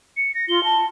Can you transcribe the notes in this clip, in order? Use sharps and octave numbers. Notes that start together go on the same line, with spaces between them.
C#7
A#6
F4 G7
A5